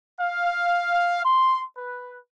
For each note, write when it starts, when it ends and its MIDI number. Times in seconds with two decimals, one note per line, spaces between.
0.21 1.21 77
1.25 1.62 84
1.77 2.19 71